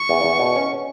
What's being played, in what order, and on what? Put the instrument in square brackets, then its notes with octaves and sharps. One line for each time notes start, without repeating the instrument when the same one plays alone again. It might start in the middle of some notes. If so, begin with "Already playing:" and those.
Already playing: [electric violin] C#6
[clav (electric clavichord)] E2
E2
B2
C#4